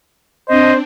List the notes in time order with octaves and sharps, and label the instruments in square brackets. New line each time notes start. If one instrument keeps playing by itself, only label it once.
[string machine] C4 D4 [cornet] C5 [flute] D#5